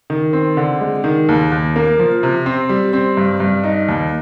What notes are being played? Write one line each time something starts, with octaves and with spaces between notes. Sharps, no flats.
D#3
C4
D3
G#3
D#3
D#2
D#2
A#3
F3
C3
C4
G3
C4
G2
G2
D#4
D#2